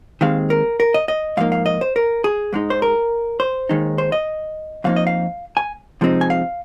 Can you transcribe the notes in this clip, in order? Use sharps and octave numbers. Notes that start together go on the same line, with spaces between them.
D#2 D#3 G#3 C4 F5
A#4
A#4
D#5
D#5
G#2 F3 A#3 D#4 F5
F5
D#5
C5
A#4
G#4
G#2 G#3 D#4
C5
A#4
C5
D#2 D#3 G#3 D#4
C5
D#5
F2 F3 A#3 D#4 F5
D#5
F5
G#5
C3 F3 G#3 C4 D#4
G#5
F5